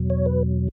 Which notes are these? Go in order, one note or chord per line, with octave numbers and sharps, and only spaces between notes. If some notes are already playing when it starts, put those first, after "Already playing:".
Already playing: E2 B2 F#3
C#5
B4